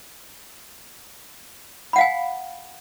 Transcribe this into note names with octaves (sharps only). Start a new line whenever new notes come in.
F5 F#5 G#5 B5